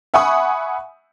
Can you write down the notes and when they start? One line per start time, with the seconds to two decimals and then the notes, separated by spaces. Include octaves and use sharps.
0.14 E5 F#5 G#5 B5 C#6 D#6